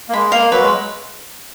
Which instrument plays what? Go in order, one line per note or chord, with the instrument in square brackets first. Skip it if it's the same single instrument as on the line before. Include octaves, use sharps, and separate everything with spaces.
[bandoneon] A#3
[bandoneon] G#3 [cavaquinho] B5
[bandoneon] A#3 [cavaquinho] F5
[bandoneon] F#3 [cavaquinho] B4
[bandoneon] G#3